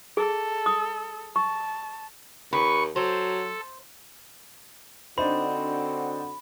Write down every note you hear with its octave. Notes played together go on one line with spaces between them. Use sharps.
G#4 A4
D#6
A5 C#6
D#2 B4 C#6
F#3 A4 C5
D3 C4 D4 D#4 F#4 C5 B5